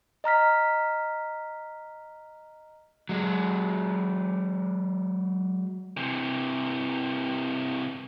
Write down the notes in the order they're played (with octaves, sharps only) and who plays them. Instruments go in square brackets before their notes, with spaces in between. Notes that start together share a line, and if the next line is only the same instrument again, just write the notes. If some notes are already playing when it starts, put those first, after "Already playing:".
[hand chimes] D#5 A#5 F6 B6
[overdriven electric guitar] F#3 G#3
[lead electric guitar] C3 E3